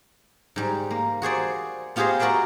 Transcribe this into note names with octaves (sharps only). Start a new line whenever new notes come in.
G#2 G3
A#3
F#4 G#4 C5 D5
B3 F4 G4 G#4 C5 D#5
F#4 A#4 D5 E5 G5